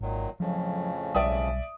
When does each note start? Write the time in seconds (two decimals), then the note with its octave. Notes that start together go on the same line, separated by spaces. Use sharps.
0.01 G#1 A#2 D#3 F#3
0.40 F2 A2 C#3 F3 F#3
1.15 B1 G3 D5 E5 D#6